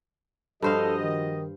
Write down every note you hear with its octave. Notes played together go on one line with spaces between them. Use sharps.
G2 F3 F#4 A4 C5 D#5 F5
D#3